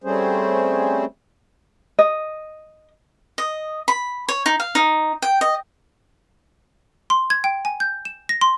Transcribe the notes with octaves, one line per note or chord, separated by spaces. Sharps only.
G3 A3 C4 C#4 G#4 C5
D#5
D#5
B5
C#5
D#4
F5
D#4
G5
D#5
C6
G#6
G5
G#5
G6
E7
A#6
C6